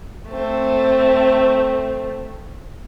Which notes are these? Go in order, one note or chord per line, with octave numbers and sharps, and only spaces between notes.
A3 C4